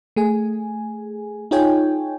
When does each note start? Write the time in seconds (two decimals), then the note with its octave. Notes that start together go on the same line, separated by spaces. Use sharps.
0.16 A3 G#4 G#5
1.51 D#4 F4 G#4 C#5 G5 G#5